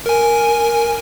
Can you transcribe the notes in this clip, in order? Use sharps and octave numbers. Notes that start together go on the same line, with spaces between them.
A#4 G#5